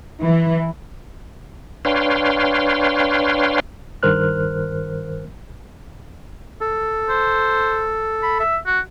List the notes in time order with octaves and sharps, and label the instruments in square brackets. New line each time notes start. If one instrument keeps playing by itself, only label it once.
[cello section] E3
[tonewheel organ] D4 B4 C#5 F5 G5 C6
[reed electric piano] G2 D#3 A#4 C5 F6 F#6
[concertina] A4
[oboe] C5
B5
E5
F#4